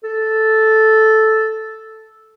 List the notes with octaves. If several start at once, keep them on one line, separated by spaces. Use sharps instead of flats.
A4